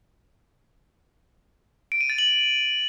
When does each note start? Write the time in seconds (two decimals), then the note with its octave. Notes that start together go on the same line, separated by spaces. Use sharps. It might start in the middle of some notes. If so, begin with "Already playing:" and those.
1.92 D7
2.01 D#7
2.10 A6
2.18 F#7